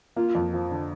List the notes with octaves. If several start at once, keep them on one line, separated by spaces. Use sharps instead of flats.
A#3 F4
F2
F3
D3